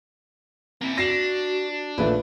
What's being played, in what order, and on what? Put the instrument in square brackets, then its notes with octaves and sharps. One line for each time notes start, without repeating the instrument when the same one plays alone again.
[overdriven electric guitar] A#3 E4 [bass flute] C4
[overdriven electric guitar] D4 [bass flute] F#4 [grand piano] A#6 C7 E7
[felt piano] A#1 F3 [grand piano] A3 B4